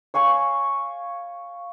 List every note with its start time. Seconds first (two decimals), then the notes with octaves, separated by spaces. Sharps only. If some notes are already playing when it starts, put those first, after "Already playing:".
0.14 C#5 F5 G#5 C#6